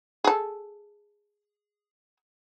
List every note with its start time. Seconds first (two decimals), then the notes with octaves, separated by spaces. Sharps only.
0.24 G#4 A4